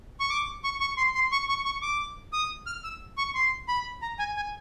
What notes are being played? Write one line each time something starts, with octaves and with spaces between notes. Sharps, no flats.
C#6
D6
C#6
C#6
C6
C6
C#6
C#6
C#6
D6
D#6
F6
E6
C#6
C6
B5
A#5
G#5
G#5